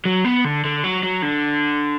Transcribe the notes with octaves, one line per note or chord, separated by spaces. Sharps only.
F#3
B3
D3
D3
F#3
F#3
D3